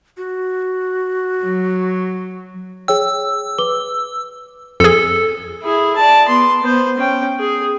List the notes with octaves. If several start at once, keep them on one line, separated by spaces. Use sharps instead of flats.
F#4
F#3
G#4 C#5 G5 E6
B4 D6 G7
F2 G#4 A4
E4 G#4
D5 A5
B3 C6
B3 C5
C#4 G5
G#4